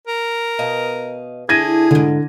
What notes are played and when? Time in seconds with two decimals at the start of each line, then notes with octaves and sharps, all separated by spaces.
0.07 A#4
0.59 B2 D#5 F5
1.49 D3 E4 G#4 A4 G#6 A#6 D#7
1.91 F2 G#2 D3